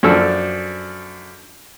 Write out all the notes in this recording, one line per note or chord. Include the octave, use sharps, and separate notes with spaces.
F#2 F3 D4 A4 E6